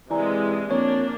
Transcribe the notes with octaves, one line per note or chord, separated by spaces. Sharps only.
C3 E3 G#3 D5 G#5 A#5
F2 A#3 D4 C#5